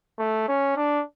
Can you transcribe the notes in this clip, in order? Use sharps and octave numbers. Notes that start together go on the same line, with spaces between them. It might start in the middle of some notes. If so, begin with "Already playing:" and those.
A3
C#4
D4